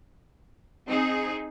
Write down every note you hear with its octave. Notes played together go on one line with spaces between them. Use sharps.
C4 D#4 G#4